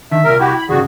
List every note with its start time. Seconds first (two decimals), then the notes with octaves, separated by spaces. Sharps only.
0.11 D3 D#3 E5
0.24 C2 A#2 A#4
0.39 E4 F#4 G4
0.57 B5
0.69 D2 G2 C#3 G3 F#4 G#4